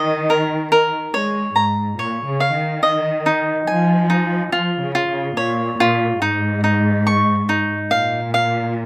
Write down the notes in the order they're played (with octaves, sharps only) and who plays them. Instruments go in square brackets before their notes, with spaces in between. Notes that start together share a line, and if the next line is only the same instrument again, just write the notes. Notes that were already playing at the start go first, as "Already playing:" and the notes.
Already playing: [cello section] D#3 [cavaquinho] D#5
[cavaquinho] A#4
A#4
[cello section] G#3 [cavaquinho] C#5
[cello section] G#2 [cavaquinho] A#5
[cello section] A#2 [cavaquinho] C#5
[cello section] C#3
[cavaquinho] F5
[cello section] D#3
[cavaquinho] D#5
D#4
[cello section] F3 [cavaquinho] G#5
[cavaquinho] D#4
[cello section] F3 [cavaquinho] F4
[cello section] C#3
[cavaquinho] F4
[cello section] C#3
[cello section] A#2 [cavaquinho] C#5
[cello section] A#2 [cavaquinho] F4
[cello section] G#2 [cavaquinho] D#4
[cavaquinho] D#4
C#6
D#4
[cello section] A#2 [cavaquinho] F5
[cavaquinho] F5